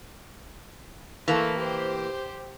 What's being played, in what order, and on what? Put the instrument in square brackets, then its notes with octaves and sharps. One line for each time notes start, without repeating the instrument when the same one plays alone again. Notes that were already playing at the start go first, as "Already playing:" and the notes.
[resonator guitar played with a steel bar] E3 A#3 [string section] A3
[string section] G4 C5